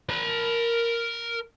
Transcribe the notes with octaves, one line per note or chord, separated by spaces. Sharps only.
A#4 B5